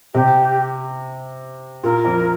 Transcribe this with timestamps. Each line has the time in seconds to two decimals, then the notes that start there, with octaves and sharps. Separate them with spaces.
0.14 C3 G4
1.83 A#2 A#4
2.05 F2